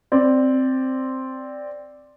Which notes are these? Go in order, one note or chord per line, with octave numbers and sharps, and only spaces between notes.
C4 D5